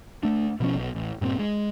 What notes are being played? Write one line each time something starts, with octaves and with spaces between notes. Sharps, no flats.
A3 D4
B2 F3 C#4
B1
A1
G2 A#2 A#3 C4
G#3